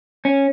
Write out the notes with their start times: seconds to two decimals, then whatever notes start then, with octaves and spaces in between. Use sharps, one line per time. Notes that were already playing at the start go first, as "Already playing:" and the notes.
0.25 C#4